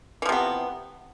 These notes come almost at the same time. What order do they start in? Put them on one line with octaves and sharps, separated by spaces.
E3 F3 C3 B3